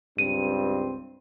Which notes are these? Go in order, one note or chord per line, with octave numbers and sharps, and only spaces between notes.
C#2 G2 C4 D#7